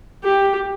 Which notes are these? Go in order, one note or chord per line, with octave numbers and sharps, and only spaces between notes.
G4